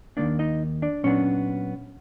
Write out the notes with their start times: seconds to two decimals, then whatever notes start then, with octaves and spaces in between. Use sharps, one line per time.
0.17 D#2 D#3 F#3 A#3 D4 D5
0.39 D#4 D#5
0.82 D4 D5
1.03 A#2 F#3 B3 C#4 D4 C#5